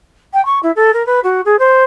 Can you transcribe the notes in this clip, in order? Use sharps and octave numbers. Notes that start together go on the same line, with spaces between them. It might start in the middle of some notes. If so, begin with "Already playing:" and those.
G5
C#6
E4
A4
A#4
B4
F#4
G#4
C5